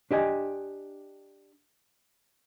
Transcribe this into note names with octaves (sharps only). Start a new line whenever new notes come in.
D4 G4 D#5 G#5